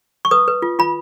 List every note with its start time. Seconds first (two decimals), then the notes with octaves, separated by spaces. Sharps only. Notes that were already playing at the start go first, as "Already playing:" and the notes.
0.25 C#6
0.31 B4 D#6
0.48 B4
0.62 F4
0.79 F4 B5